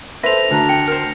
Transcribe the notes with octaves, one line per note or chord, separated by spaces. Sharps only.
A4 B4 C5 E5 A#6 F7
D2 D4 A#5
G5 C#7
A#4 C5